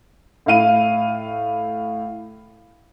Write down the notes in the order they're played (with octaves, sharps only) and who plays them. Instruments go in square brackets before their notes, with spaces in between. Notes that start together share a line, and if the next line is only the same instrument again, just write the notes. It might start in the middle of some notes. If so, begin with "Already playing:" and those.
[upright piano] A2 E4 F5 D#7